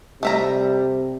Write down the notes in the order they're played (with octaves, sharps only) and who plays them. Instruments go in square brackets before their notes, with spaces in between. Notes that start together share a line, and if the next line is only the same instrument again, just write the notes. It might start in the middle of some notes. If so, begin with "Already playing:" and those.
[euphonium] C3 [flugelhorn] G3 [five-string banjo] A3 E5 A#5